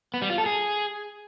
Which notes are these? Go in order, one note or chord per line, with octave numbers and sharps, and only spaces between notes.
B3
G3
F4
A4
G#4